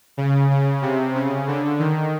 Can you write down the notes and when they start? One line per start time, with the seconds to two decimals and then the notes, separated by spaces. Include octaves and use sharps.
0.17 C#3
0.50 C#3
0.82 C3
1.15 C#3
1.48 D3
1.79 D#3